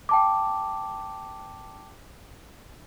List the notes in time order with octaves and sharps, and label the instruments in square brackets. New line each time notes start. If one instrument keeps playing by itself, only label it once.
[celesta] G5 A5 D6